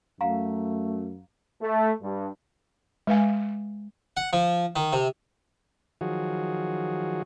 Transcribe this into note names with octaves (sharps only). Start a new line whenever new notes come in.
F#2 A3 F5 F#5 A#5
A3
G2
G#3 B4 F5 G#5
F#5
F3
D#3
C3
D#3 F3 F#3 F#4 G#4